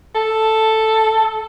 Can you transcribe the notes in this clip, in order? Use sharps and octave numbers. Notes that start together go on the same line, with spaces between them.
A4